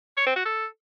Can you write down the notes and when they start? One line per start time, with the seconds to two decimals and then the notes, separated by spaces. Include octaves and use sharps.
0.17 C#5
0.27 C4
0.36 F#4
0.45 A4